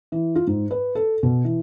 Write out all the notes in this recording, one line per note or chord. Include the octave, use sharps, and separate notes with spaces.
E3
F4
G#2
B4
A4
B2
E3